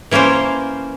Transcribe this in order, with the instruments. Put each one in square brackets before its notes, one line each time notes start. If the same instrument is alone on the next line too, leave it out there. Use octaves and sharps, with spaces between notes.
[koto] E3 A#3 C#4 A#4 C5